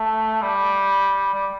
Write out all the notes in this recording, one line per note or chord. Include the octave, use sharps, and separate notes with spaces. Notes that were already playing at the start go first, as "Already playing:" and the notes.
Already playing: A3
G3
G3